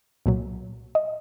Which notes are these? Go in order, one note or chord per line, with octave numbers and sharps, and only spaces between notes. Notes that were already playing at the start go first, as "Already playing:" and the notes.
C2 A#2 F#3
D#5